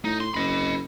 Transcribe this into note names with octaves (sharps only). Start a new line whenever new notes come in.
A2 D#4
C6
F#1 D#5 B5